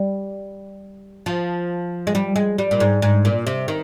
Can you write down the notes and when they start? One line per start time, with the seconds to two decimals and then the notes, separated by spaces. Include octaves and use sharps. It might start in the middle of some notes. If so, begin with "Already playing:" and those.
Already playing: G3
1.26 F3
2.07 G#3
2.15 G3
2.36 G#3
2.58 G3
2.71 A#2
2.80 G#2
3.02 G#2
3.25 A#2
3.47 C3
3.68 D#3